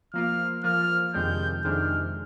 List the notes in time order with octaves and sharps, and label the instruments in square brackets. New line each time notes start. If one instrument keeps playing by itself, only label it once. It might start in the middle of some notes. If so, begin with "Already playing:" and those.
[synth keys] F3 A#3 F4 [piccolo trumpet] F6
[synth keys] F3 A#3 F4 [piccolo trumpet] F6
[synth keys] F2 C3 D#3 G#3 D4 [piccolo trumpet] G6
[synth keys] F2 C3 D#3 G#3 D4 [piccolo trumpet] F6